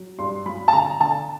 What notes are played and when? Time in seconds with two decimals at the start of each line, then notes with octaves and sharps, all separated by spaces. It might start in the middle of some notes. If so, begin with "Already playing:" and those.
Already playing: F#3
0.19 G2 C6
0.46 F#3 B5
0.68 A5
0.73 D3 A#5
1.00 D3 A5